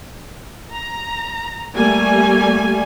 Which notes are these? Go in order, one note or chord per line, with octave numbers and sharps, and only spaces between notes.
A#5
G3 A3 A#3 G#5